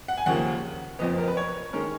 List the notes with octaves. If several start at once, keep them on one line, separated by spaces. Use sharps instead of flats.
F#5
G#5
D#2 C#3 F3 A#3 F#5
F#1 F2 F3 B3 D#5
A#4
B4
C#5
D#3 G#3 C#4 A#4